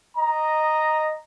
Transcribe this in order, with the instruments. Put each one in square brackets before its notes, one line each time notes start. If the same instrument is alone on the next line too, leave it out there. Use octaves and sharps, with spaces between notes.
[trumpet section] D#5 A#5